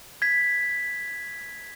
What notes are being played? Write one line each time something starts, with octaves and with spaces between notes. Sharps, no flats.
G#6 B6